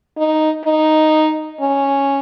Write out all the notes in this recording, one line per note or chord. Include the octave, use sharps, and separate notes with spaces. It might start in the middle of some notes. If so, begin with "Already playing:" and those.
D#4
D#4
C#4